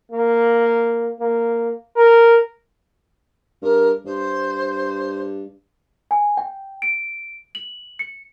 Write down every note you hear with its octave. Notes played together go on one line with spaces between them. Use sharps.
A#3
A#3
A#4
G2 A#4
G2 C5
G#5
G5
D7
F#7
C#7